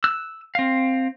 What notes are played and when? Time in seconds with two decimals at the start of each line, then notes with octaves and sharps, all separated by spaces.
0.04 E6 F#6
0.55 C4 F5